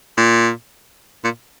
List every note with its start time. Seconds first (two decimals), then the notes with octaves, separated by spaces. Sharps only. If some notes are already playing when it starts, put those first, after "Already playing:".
0.17 A#2
1.24 A#2